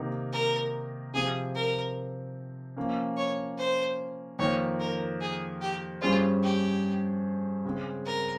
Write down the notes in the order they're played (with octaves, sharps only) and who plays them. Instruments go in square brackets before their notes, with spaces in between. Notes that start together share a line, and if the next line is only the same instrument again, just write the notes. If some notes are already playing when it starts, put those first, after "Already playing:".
Already playing: [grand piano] C3 D#3 A#3 D#4 A#4
[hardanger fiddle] A#4
[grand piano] C3 F3 C4 [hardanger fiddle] G#4
[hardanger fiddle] A#4
[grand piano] F3 A#3 C#4
[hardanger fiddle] C#5
C5
[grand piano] F2 D#3 A#3 [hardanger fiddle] C#5
[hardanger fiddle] A#4
G#4
G4
[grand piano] G2 G3 C#4 G#4 C5 [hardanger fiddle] F4
[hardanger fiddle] G4
[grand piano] C#3 G#3 C4
[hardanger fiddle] A#4